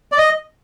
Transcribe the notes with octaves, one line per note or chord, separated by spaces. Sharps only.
D5
D#5